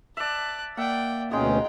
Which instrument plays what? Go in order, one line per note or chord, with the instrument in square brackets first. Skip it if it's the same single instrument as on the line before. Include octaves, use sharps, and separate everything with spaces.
[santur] D5 E5 [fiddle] A5 F#6
[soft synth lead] A#3 [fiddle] D5 G5 [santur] E5 F#5
[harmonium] D2 B2 C#4 [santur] G#3 D#4 G#4 [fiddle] F4 G5